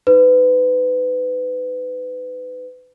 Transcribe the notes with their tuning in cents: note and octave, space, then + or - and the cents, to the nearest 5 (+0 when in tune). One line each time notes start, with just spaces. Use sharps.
D#4 +0 B4 +30